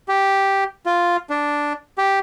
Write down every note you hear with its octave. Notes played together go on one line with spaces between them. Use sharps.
G4
F4
D4
G4